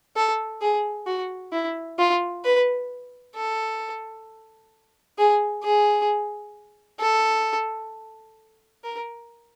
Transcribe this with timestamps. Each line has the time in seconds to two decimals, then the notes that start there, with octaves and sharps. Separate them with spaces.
0.16 A4
0.61 G#4
1.07 F#4
1.52 E4
1.99 F4
2.45 B4
3.36 A4
5.18 G#4
5.64 G#4
7.00 A4
8.84 A#4